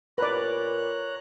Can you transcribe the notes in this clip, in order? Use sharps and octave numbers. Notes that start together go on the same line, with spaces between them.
A#2 B4 C#5 D5 A#5 F#6